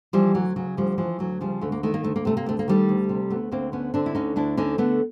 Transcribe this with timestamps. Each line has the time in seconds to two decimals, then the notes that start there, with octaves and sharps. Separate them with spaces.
0.13 E3 F3 G3
0.34 D2 F#3
0.56 C#3 F#3
0.77 D2 F3 G3
0.98 E3 F3
1.19 D2 F#3
1.41 C#3 F3 G3
1.61 D2 A3
1.72 A#3
1.83 D#3 A3
1.94 A#3
2.03 D2 A3
2.16 A#3
2.25 C3 A3
2.37 A#3
2.46 D2 A3
2.59 A#3
2.68 D#3 G3 A3
2.89 D2
3.09 C3
3.30 D2 A3 B3
3.52 D2 A#3 C4
3.72 D3 B3 C#4
3.94 D3 C4 D4
4.06 E4
4.15 D2 C#4 D#4
4.36 D2 D4 E4
4.57 D3 C#4 D#4
4.78 D3 A3 B3